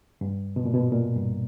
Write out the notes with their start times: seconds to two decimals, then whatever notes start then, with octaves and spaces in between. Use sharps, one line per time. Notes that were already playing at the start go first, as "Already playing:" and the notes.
0.21 G2
0.56 B2
0.65 A#2
0.74 B2
0.92 A#2
1.16 G2